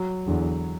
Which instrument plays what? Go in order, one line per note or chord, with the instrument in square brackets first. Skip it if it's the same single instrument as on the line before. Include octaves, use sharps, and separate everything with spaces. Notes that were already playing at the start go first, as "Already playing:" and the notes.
Already playing: [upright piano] F#3
[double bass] E2 [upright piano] D3